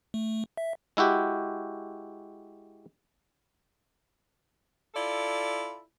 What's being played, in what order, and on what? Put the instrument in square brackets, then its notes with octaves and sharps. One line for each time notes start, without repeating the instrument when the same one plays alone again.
[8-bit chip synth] A3
E5
[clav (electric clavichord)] G#3 E4 F#4 G4
[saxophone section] E4 F4 A4 D5